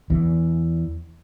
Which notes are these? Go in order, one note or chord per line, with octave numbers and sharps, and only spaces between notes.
E2 E3